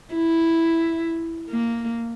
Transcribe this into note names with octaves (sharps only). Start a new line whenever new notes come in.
E4
A#3